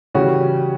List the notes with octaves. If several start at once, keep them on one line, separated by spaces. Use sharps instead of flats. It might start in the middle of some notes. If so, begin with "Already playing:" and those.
C#3 E3 G3 C#4 F#4